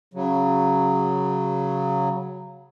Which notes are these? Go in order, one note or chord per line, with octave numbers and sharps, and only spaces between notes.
C#3 F#3